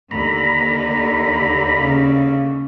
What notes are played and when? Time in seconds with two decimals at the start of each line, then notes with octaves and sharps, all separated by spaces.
0.11 D#2 D3 A#5 B5
1.79 C#3